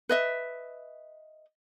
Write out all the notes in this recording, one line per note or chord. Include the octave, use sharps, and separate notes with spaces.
B4 D#5 E5